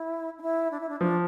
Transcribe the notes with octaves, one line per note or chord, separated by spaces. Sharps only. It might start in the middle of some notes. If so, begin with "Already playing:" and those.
Already playing: E4
D4
E4
D4
E4
D4
F3 D4